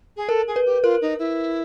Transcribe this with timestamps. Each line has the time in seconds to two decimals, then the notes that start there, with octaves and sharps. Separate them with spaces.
0.16 G#4
0.29 A4 A#4
0.47 G#4
0.56 B4
0.65 G4
0.83 F4 A#4
1.01 D#4
1.19 E4